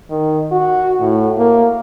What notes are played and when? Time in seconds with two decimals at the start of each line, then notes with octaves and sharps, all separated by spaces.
0.10 D#3
0.52 F#4
1.00 A2
1.38 A#3